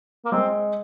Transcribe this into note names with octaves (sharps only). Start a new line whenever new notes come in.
A#3
G#3 C4